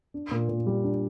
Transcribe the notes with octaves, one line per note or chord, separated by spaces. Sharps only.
D4
A#2
A#2
G3
D4